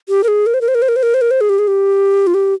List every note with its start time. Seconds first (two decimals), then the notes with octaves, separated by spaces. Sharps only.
0.09 G4
0.24 A#4
0.28 G#4
0.46 A#4
0.54 C5
0.61 A#4
0.68 C5
0.75 A#4
0.82 C5
0.89 A#4
0.96 C5
1.03 A#4
1.14 C5
1.21 A#4
1.31 C5
1.41 G#4
1.49 G4
1.59 G#4
1.68 G4
2.27 F4
2.34 G4